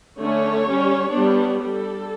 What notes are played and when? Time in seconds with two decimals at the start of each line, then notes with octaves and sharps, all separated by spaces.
0.19 D3 A3 C#4 C#5
0.66 G3 C#4
1.11 G3 B3 D4
1.58 G3 D4 A4